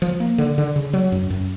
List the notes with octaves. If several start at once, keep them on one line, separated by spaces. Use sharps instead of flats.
F3
A#3
D3
D3
C#3
F#3
F#2
F#2